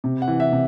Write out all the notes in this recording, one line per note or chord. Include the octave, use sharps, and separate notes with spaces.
C3
F#5
E3
E5
C3